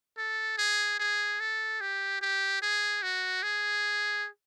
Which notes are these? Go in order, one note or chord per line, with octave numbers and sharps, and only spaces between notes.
A4
G#4
G#4
A4
G4
G4
G#4
F#4
G#4